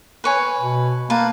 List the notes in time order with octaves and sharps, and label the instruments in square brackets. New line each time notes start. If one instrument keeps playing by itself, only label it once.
[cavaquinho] B4 C#5 G#5
[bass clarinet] B2
[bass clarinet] A#3 [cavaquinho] B4 A5